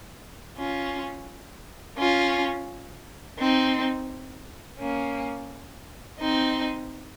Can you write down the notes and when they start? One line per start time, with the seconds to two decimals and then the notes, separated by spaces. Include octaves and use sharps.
0.57 C#4 F4
1.98 C#4 F4
3.38 C4 D#4
4.80 A#3 C#4
6.20 C4 D#4